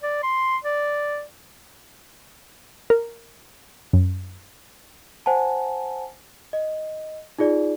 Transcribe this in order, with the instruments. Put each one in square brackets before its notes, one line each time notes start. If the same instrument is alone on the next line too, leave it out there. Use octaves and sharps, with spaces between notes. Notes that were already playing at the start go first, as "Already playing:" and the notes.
[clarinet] D5
C6
D5
[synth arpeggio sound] A#4
F#2
[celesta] C5 F#5 G#5 A5
D#5
D#4 F4 G#4 D5